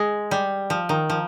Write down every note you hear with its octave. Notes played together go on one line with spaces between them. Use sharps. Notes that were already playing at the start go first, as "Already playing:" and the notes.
Already playing: G#3
G3
F3
D#3
F3